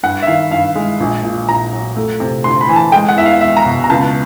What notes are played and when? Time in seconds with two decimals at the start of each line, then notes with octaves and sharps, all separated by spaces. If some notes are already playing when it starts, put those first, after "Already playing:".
0.03 G2 F#5
0.22 E5
0.27 D#3 F5
0.51 G2 F5
0.75 G#3
1.00 A#1
1.23 A#2
1.49 A#1 A#5
1.73 F#3
1.96 A3
2.20 C3
2.44 D2 C6
2.61 B5
2.68 E3 G#5
2.76 A5
2.92 G#3 G5
3.09 F#5
3.16 E2 E5
3.25 F5
3.41 E1 E5
3.57 A#5
3.65 B2
3.84 A#5
3.90 C#2 A5